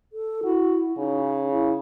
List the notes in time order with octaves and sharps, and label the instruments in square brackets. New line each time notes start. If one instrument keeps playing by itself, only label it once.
[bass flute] A4
[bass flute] E4 [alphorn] F#4
[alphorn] C#3 [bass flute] D#4
[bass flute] E4